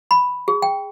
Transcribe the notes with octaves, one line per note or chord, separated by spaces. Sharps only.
B5
G#4
G5